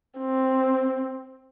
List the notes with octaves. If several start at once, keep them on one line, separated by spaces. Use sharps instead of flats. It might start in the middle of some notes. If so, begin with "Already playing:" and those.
C4